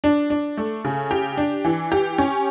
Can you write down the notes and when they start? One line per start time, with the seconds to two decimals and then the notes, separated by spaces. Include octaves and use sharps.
0.04 D4
0.30 D4
0.57 A3
0.85 C#3
1.11 G4
1.37 D4
1.65 E3
1.92 G4
2.18 C#4